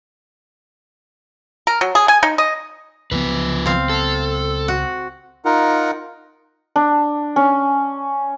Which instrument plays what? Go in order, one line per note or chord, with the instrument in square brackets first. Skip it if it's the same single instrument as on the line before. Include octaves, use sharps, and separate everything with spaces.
[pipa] A#4
F#3
G#4
G#5
D#4
D#5
[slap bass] C#2 F#3 B3 [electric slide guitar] F3 B4
[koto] C4 F5
[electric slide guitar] A4
[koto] F#4
[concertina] D#4 F4 A#4 F#5
[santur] D4
C#4